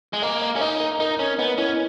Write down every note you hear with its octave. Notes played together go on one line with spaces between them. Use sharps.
G#3
A#3 D#5
D#5
C#4
D#4 D#5
A#4
D#4 A#4
C#4 A#4
B3 D#5
C#4 E4